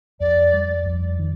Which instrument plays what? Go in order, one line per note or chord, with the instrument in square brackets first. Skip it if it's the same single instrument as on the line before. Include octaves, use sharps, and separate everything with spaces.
[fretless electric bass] F2 [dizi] D5
[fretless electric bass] G3
F2
D#3